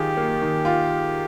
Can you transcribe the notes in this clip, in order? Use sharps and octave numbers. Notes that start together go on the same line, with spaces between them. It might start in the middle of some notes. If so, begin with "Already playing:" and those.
Already playing: D#3 F4 G4 G#4
A#3
D#3
F4